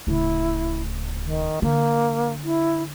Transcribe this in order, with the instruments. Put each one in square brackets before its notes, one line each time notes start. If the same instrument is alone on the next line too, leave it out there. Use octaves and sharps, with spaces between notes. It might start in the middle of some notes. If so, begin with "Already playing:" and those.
[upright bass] D1 C#3 [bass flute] E4
[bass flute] D#3
[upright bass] D3 [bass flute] A#3
[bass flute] E4